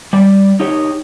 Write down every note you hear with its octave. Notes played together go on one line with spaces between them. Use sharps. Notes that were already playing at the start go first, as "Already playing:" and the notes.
G3 D5
D#4 G4 C#5